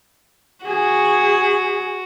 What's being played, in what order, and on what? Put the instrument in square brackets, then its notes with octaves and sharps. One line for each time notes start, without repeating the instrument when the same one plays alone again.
[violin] F#4 [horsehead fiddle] G#4